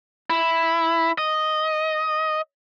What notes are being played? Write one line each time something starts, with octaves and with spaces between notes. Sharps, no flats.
E4
D#5